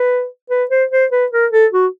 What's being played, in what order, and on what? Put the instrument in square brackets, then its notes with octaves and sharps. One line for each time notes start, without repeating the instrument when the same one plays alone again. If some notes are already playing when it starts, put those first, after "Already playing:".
Already playing: [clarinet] B4
B4
C5
C5
B4
A#4
A4
F#4